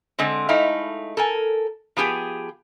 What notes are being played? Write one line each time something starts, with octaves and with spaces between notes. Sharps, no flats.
D3 G#3 C4
G#3 A3 D#4 E4 F5
A4 A#4 G#5
F3 B3 G4 G#4